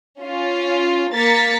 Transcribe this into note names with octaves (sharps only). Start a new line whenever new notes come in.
C#4 F4
A#3 A#4 A6 B6 C#7